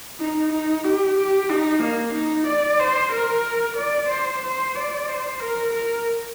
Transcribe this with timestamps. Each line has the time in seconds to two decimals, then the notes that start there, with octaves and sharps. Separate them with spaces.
0.20 D#4
0.52 D#4
0.84 G4
1.18 G4
1.49 D#4
1.82 A#3
2.14 D#4
2.47 D5
2.79 C5
3.12 A#4
3.77 D5
4.10 C5
4.43 C5
4.75 D5
5.08 C5
5.40 A#4
5.73 A#4